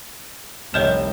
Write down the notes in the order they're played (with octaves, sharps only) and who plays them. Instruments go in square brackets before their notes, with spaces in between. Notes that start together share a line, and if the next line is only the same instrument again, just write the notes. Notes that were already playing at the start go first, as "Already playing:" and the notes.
[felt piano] F1 G6 E7 [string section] C2 [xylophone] C#5 D#5 F6